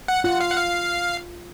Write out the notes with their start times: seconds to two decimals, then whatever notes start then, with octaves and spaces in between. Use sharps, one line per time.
0.08 F#5
0.24 F4 F#5
0.41 F5
0.50 F#5
0.57 F5